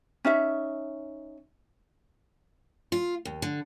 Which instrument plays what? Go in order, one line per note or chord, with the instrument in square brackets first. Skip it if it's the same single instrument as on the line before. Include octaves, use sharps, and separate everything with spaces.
[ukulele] C#4 D#4 E5
[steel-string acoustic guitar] F4
D#2
D3